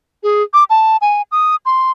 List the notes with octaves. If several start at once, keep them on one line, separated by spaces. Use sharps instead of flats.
G#4
D6
A5
G#5
D#6
C6